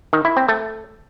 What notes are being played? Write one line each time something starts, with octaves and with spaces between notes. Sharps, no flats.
D#3
E4
C4
A3